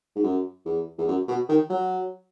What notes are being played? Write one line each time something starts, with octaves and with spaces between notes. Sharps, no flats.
G#2
F#2
E2
E2
F#2
B2
D#3
F#3